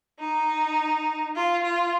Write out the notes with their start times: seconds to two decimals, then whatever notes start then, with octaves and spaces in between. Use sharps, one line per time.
0.20 D#4
1.36 F4
1.64 F4